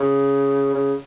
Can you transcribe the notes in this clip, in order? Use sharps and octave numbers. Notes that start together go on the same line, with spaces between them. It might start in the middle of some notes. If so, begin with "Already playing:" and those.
Already playing: C#3
C#3